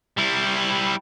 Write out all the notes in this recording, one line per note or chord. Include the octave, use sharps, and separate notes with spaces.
G3 E4